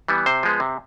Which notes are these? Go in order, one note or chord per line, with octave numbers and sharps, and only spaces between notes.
E3 G3 B3
C3 C5
F3 G#3 B3
C3